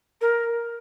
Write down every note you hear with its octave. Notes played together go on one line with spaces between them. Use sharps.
A#4